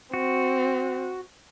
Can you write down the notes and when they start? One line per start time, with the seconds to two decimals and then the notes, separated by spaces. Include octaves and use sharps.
0.14 C4 F#4